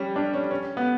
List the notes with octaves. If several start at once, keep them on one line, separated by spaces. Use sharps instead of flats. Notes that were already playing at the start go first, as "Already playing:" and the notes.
Already playing: G3 C#4
D4
C#4
C#4
B3